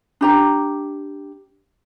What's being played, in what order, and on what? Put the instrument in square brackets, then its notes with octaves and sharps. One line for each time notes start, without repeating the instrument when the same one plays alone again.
[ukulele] D4 G4 A#5